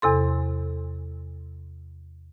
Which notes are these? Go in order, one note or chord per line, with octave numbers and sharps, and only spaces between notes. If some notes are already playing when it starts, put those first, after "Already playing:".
E2 C3 A4 C6